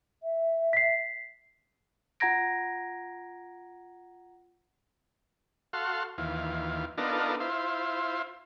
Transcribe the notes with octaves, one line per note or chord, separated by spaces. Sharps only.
E5
B6 C7
F4 F#5 A#5 G#6 A#6 D7
F#4 A4 F5 C6
D#2 E3 F4
B3 D4 D#4 F4 A4 A#4
E4 F4 C5